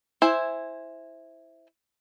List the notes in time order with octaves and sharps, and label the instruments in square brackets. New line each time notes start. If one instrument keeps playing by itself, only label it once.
[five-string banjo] E4 C5 G#5